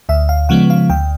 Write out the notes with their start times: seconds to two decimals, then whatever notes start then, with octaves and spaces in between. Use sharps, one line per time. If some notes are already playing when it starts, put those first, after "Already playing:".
0.09 D2 E5
0.29 F5
0.49 C#3 F3 G#3 B3 F#5
0.70 F5
0.90 D2 G5